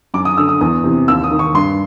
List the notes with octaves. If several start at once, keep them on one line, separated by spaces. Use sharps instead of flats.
F#2 D6
D#6
D3 E6
D#6
E2 D#6
C3 E3
D#2 E6
D#6
D#3
C#6
G2 C6